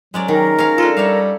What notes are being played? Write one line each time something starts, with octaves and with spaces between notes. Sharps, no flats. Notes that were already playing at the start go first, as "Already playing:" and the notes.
F#3 G#3 C#4 D5
D#3 A#4
C#4 F5
D4 F4 A4
G3 C#5 E5 F5